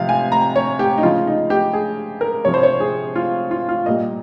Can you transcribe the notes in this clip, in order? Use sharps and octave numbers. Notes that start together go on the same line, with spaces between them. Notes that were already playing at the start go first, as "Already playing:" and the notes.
Already playing: C3 F3 F5
G#5
A#5
C#5
G4
D#4
C#3 F3 F4
D#4
G4
G#4
A#4
C3 F3 C#5
C5
C#5
G#4
F4
F4
F4
A#2 G3 D#5